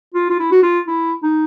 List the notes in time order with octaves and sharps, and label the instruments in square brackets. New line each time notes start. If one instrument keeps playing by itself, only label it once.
[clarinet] F4
F4
E4
F#4
F4
E4
D#4